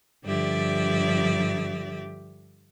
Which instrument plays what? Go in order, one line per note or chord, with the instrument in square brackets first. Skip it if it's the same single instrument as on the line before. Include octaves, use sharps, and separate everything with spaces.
[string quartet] G2 D3 F3 G4 D5 E5